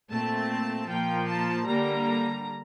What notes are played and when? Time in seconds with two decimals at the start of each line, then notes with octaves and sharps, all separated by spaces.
0.10 A#2 A3 C4 A5
0.89 A#2 F3 A#3 G5
1.29 A5
1.67 D3 G3 A#3 A#5